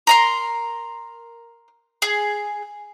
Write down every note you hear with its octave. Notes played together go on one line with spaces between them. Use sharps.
A#4 A#5 C6
G#4